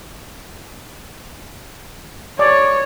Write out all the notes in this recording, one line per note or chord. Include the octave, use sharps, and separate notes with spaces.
C#5 D5